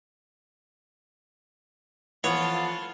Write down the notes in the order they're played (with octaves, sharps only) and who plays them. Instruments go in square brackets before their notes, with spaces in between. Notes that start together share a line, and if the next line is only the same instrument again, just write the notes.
[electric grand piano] E3 F3 [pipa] B3 [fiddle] F4 A4 [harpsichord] C#5